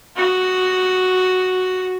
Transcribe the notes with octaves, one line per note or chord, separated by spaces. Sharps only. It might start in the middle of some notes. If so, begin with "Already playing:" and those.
F#4